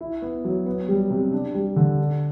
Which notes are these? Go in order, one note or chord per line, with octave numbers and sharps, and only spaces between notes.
E4
B3
F#3
B3
G3
C3
D4
G3
D3
D4